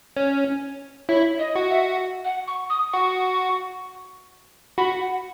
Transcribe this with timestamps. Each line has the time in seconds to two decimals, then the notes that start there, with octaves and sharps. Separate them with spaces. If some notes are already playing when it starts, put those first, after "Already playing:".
0.17 C#4
1.09 E4 C#5
1.39 D#5
1.56 F#4
1.70 E5
2.25 F#5
2.48 C#6
2.70 D#6
2.93 F#4 C#6
4.78 F#4 B5
5.01 F#5